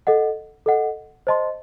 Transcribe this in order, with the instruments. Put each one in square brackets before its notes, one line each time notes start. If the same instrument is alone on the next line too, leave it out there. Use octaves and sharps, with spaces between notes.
[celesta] A4 D#5 F#5
A4 D#5 F#5
C5 D#5 A5 C6